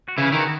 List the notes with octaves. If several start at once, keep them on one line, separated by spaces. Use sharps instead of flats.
F#4
C#3 E3 E4
D#3 E3 E4
F#4